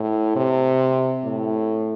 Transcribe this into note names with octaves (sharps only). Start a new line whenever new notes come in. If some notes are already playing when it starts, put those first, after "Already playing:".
Already playing: A2
C3
A2